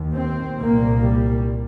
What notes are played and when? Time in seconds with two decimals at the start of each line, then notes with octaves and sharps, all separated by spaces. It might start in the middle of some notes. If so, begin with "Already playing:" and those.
Already playing: D#2
0.16 C4
0.58 C2 A#2 A#3
1.01 G3